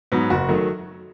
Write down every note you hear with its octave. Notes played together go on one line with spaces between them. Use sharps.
G#2 F#3 B3
F#1 F#4
D#3 F#3 A3